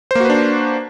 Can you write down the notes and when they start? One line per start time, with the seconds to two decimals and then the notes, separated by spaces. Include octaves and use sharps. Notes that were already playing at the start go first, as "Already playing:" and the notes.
0.11 C5
0.15 A#3
0.20 F#4
0.25 B4
0.30 D4